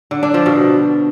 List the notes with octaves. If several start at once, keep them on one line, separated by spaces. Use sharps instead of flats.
D3
D4
F3
B2